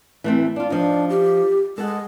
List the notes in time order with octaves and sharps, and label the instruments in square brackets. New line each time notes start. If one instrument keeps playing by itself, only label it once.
[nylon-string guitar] E3 A3 C4
D4 F4
[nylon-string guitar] F3 D#4 [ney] D4
[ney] G4
[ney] G#3 [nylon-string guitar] A4 F#5